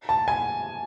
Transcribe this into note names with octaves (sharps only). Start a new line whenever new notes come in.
A5
G#5